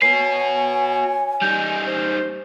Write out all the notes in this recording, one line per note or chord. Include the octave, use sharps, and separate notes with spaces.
F#4 B4 C#5 G#5 C7
G3 D#4 G6
C5